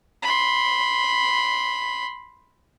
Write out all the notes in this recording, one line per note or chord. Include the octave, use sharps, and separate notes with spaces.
B5 C6